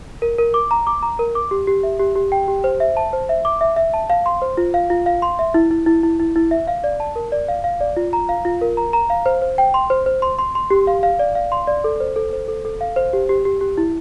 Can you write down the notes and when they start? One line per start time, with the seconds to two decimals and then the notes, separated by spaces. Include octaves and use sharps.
0.22 A#4
0.38 A#4
0.54 D6
0.71 A#5
0.87 D6
1.03 A#5
1.19 A#4
1.35 D6
1.51 G4
1.67 G4
1.83 E5
2.00 G4
2.16 G4
2.32 G5
2.48 G4
2.64 C5
2.80 E5
2.97 A5
3.13 C5
3.29 E5
3.45 D6
3.61 E5
3.76 E5
3.94 A5
4.10 F5
4.26 C6
4.42 C5
4.57 F4
4.74 F5
4.90 F4
5.06 F5
5.22 C6
5.39 E5
5.54 E4
5.71 E4
5.86 E4
6.03 E4
6.19 E4
6.36 E4
6.51 E5
6.67 F5
6.84 D5
7.00 A5
7.16 A#4
7.32 D5
7.48 F5
7.64 F5
7.81 D5
7.97 F4
8.13 A#5
8.29 F5
8.45 F4
8.61 A#4
8.77 A#5
8.93 A#5
9.10 F5
9.26 C5
9.42 C5
9.58 G5
9.74 C6
9.90 C5
10.06 C5
10.22 C6
10.38 C6
10.55 C6
10.70 G4
10.87 F5
11.03 F5
11.19 D5
11.35 F5
11.52 C6
11.67 D5
11.84 A4
12.00 C5
12.16 A4
12.33 C5
12.48 A4
12.65 A4
12.81 F5
12.96 C5
13.13 G4
13.29 G4
13.45 G4
13.61 G4
13.78 E4